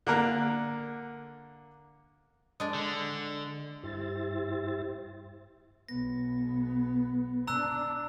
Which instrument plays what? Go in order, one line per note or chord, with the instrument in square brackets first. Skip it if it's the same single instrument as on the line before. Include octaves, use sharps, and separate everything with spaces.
[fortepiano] D3 A#3 A#4 F#6
[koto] G#3 D4
[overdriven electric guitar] D3
[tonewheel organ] G2 E4 G4 C5 E5 A6
[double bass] B1 B3 [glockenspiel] A#6
[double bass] D4 [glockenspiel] A#5 E6 F#6